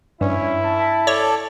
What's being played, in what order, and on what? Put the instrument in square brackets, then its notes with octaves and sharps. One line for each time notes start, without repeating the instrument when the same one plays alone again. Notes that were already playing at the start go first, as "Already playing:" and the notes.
[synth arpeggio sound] G2 [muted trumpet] C#4 [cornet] E4
[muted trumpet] A5
[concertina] A4 D5 [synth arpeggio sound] C#5